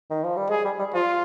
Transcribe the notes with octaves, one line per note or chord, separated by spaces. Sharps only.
D#3
F3
G3
G#3 G#4
G3
G3
F3 F4